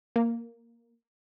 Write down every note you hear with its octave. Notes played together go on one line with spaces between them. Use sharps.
A#3